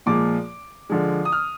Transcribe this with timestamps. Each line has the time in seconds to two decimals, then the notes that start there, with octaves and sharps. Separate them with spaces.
0.06 A#2 F3 G#3 D6
0.90 D3 F3 G#3
1.25 D#6
1.32 F6